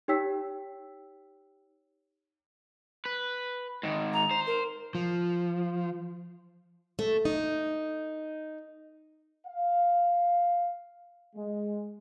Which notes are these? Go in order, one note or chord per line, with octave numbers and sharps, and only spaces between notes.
D#4 G4 C#5 G5 E6 B6
B4
G#2 D#3
A#5
C5
A#4
F3
A3
D#4
F5
G#3